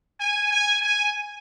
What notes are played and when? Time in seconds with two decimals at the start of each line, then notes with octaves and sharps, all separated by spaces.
0.20 G#5
0.51 G#5
0.82 G#5